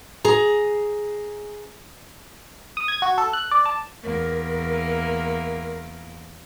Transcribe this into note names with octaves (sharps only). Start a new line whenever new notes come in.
G#4 A#5
D#6
G#6
F#4
A4
F#6
D5
A5
E2 A#3 A#4